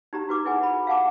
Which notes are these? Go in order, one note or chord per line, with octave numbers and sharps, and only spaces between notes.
D#4 G4 A#5
F#4 B4 D6
E4 G#4 B4 F#5 G#5
B5
F5 F#5 A5 D6